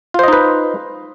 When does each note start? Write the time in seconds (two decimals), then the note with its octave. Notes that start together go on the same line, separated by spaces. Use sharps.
0.14 F4
0.19 C5
0.24 D#5
0.28 D#4
0.33 B4